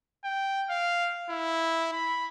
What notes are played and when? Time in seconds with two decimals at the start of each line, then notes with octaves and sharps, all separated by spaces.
0.24 G5
0.70 F5
1.30 E4
1.93 B5